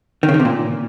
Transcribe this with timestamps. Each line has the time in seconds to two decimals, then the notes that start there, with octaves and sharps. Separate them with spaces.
0.23 D#3
0.29 C#3
0.34 D#3
0.39 C3
0.45 A#2